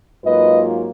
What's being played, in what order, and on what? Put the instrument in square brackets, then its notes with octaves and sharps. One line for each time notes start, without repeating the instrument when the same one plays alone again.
[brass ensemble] G#2 F#3 A#3 F4 B4 D#5